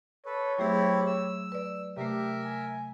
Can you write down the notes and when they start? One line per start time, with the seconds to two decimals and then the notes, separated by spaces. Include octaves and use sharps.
0.26 A4 B4 C#5
0.59 F#3 A3 C4 E4 G4 G#4
1.07 E6
1.52 B4 D5
1.97 C3 A3 G4 A#4 E5
2.45 G#5